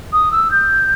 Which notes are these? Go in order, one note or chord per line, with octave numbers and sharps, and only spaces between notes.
D#6
E6
G6